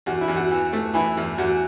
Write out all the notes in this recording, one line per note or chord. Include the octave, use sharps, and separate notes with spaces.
E2 F#4
E4
E2
F#4
E3
A3
E3 E4
E2
E2 F#4